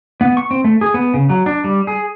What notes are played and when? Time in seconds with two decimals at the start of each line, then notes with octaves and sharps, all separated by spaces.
0.21 B3
0.37 C#6
0.51 C4
0.64 A3
0.81 G#4
0.94 B3
1.14 C#3
1.30 F#3
1.46 D4
1.64 G3
1.87 G#4